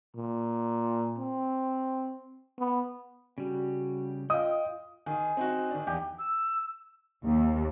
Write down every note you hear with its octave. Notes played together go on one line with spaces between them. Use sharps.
A#2
C4
B3
C#3 G3 F#4
F4 D#5 F5 G5 D#6
D#3 G#4
C4 D#4 F#4
D#3 D4
E2 G4
E6
D#2